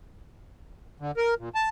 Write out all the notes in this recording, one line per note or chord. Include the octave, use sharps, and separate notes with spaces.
D3
A#4
A#2
A5